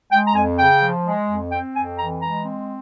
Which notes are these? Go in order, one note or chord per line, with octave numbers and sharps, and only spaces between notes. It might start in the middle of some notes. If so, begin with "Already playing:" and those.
G#3 G5
A#5
F2 G#5
C#3 G5
F3
G#3
F2
C4 G5
F2 G#5
E3 A#5
G#3 A#5
C4